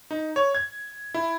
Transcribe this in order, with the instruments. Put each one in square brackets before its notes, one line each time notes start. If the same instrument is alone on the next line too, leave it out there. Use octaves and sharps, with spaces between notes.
[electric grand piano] D#4
C#5
G#6
E4